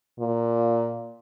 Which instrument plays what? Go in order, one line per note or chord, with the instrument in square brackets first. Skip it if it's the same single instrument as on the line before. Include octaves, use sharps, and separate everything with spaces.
[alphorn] A#2